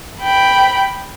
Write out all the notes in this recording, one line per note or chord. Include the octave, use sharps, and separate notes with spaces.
G5 B5